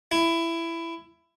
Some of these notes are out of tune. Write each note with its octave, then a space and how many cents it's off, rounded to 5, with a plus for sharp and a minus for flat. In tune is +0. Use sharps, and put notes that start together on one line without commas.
E4 +15